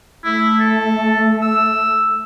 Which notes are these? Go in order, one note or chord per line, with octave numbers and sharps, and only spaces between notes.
A3 E4
A4
E6